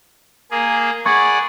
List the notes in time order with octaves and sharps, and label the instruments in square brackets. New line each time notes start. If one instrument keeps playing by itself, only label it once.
[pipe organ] A#3 G#4
[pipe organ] G#4 D5 F#5 [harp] B5 C#6 G#6